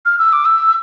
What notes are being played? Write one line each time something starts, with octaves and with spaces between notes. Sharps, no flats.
F6
E6
D6
E6